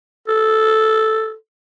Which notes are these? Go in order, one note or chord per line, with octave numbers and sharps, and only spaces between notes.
A4